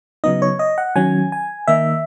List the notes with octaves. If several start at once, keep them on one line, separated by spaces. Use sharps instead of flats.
C#3 F#3 B3 D#4 D#5
C#5
D#5
F#5
D#3 F#3 C#4 G#5
G#5
D#3 A#3 D#4 E5